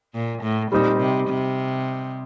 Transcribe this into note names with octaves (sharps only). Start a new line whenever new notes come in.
A#2
A2
A#2 G3 C4 D#4
C3
C3